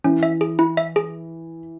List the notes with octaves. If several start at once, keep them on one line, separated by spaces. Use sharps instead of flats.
E3 C#4
E5
G#4
E4
E5
G#4